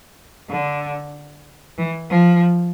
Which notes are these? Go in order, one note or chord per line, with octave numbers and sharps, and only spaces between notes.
D3
E3
F3